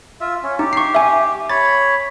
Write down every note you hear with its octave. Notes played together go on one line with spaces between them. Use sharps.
F4 E5
C#4
D#4 G4
C#6 C7
E5 G#5
C#5 B5 A6